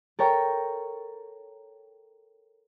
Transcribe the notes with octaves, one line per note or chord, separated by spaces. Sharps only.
A4 A#4 C#5 G5 A#5